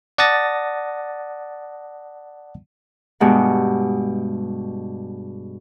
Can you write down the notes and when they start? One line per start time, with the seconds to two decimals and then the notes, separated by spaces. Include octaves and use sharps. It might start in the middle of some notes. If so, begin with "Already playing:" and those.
0.18 D5 F#5 A5 D#6 A6 A#6
3.20 G2 B2 G#3 F#5